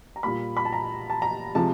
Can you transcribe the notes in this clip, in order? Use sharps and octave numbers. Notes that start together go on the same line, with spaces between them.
A#5
A#2 G3 A#3 B5
B5
A5
A#5
A5
A#5
C3 F3 G#3 A5